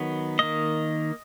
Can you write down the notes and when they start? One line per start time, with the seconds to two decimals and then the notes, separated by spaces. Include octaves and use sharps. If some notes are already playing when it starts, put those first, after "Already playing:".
Already playing: D#3 F#3 B3
0.39 D#3 A#3 D#5